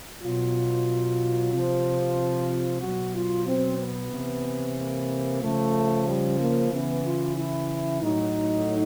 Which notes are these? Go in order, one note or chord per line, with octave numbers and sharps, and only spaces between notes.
B2 F#3 F4
C3 F3
B2 F#3 F#4
F4
C4
B3
C3 E3
A#3
C#3 F3 A3
G3
A#3
C#3 E3 B3
F4
E4
A2 F#3 D#4